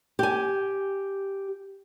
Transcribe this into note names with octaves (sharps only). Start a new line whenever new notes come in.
G4 G#5